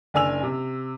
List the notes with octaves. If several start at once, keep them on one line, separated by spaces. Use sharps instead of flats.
F#1 D4 G#5 E6 F7
C3